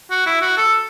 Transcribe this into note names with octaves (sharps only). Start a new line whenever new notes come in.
F#4
E4
F#4
A4